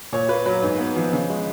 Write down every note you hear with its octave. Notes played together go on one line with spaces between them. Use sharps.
A#2 C#5
A#3 B4
F#3 B4
G#2
B3
F3
C#3
G#3